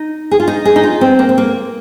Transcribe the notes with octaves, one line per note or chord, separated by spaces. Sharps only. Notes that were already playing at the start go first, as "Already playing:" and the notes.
Already playing: D#4
G#4
F4
D#4
G#4
D#4
F4
C4
A#3
C4
A#3